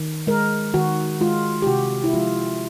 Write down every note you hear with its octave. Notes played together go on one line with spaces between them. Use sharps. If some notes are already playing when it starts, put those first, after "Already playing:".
Already playing: D#3
G#3 A#4
D#3 F#4
G#3 F4
G4
C3 F#4
E4
F3 G#3 F4